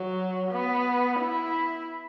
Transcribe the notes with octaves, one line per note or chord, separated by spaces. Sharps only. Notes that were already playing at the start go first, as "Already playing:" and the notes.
Already playing: F#3
B3
E4